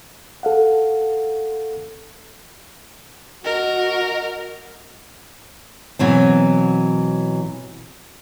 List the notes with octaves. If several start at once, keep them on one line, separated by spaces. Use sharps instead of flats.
A4 F5 F#5
F#4 A#4 D#5
B2 E3 F#3 C4